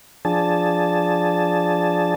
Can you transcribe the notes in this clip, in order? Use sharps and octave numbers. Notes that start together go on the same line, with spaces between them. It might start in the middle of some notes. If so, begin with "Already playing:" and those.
F3 D4 G#4 A5